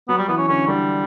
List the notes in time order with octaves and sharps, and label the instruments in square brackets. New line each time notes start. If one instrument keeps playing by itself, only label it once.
[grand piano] F#3 [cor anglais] B3
[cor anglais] G3
[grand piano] E3 [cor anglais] B3
[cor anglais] C#4
[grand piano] D3 [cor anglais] C#4
[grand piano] D3 [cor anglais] G3